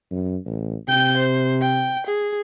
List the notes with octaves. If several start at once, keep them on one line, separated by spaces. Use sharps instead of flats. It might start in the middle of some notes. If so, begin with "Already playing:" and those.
F#2
A1
C3 G5 G6
C5
G5
G#4